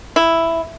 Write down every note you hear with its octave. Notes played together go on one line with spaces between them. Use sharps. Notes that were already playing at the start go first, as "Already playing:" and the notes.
E4